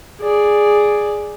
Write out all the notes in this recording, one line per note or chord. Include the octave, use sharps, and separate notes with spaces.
G#4 D5